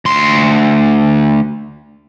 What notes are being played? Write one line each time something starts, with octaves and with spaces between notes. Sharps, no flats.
D2 C6